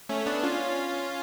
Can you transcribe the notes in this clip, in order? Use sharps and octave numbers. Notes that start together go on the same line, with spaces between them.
A3 C#4
B3 D4
C#4 F4